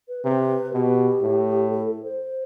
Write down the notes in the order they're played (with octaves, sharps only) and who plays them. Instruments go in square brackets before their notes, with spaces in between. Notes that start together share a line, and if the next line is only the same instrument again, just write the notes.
[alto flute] B4
[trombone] C3 [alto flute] B4
[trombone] B2 [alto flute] G4
[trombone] A2
[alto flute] A4
A4
C5